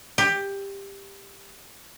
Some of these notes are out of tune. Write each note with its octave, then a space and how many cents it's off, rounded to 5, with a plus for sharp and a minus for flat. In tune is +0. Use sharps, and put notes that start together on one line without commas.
G4 +15